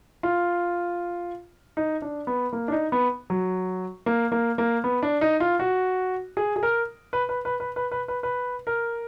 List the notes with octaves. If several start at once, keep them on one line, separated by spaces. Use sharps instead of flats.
F4
D#4
D4
B3
A#3
D4
D#4
B3
F#3
A#3
A#3
A#3
B3
D4
D#4
F4
F#4
G#4
G#4
A#4
B4
B4
B4
B4
B4
B4
B4
B4
A#4